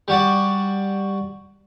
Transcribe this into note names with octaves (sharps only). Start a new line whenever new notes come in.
G3 F#4 D5